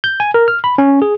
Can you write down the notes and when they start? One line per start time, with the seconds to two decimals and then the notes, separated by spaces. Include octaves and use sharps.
0.04 G6
0.20 G#5
0.34 A#4
0.48 F6
0.64 B5
0.78 C#4
1.02 G#4